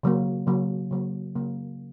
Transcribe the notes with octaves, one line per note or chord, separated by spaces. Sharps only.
C#3 F#3 A#3
C#3 F#3 A#3
C#3 F#3 A#3
C#3 F#3 A#3